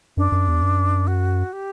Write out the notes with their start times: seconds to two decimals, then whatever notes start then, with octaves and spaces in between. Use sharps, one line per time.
0.17 F#2 D4
0.32 F#2
0.48 E2
0.62 F#2
1.07 F#4
1.53 G4